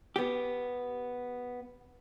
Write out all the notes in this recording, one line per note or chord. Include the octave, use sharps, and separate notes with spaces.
B3 G4